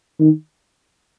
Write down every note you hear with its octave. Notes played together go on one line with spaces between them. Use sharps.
D#3